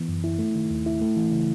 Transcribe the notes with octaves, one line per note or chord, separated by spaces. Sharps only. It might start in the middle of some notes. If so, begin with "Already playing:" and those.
Already playing: E3 B3
F#2
E4
A3
D#3
D#2
E4
A3
E3
C#3